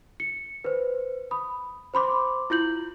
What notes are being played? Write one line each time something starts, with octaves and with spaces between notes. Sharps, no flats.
C#7
B4 C5
B5 D#6
C5 B5 C6 D6
E4 F4 G6 F#7